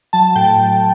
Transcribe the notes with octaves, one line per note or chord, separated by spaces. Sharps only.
F#3 A5
A2 G5